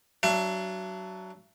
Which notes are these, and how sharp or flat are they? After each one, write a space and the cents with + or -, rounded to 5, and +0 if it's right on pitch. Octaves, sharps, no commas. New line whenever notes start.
F#3 +20 D4 +5 E5 +40